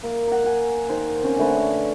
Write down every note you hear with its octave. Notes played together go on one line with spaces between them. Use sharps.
A#3
F#5 A#5
F#5 G#5
D#3 C5
C4 C#4 C5
D3 A3 B4 C#5